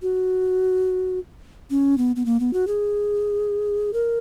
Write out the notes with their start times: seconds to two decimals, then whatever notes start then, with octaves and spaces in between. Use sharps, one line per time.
0.02 F#4
1.70 C#4
1.98 B3
2.16 B3
2.25 A#3
2.40 B3
2.53 F#4
2.67 G#4
3.93 A#4